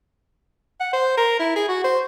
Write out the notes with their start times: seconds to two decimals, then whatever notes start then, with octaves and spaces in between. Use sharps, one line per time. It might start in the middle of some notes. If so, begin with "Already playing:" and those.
0.80 F#5
0.93 C5
1.17 A#4
1.39 E4
1.55 G#4
1.68 F#4
1.84 C5